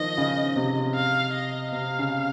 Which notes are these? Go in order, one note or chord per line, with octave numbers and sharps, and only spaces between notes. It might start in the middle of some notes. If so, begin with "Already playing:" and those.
Already playing: D#3 F3 D#5
C#3
C3
F5
D#5
C3 F5
C#3